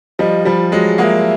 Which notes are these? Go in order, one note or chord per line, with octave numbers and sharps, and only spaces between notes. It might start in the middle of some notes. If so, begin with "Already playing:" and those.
F3 G3 D#5
F3 G3
F#3 G#3
G#3 A#3 E5 F#5